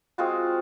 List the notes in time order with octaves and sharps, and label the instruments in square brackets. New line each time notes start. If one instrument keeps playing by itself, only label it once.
[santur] G#3 C4 F4 F#4